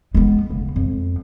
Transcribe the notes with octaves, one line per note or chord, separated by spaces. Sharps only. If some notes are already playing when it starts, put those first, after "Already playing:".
G#3 B3
C#3
F2